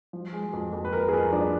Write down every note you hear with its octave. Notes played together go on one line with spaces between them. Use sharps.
F3
G#3
F2
F2
B4
F2 A#4
G#4
F2 A#4
F3 D4